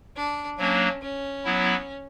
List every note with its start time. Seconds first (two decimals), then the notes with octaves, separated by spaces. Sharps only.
0.16 D4
0.58 F#3 A#3 C#4 D4
1.02 C#4
1.45 F#3 B3 E4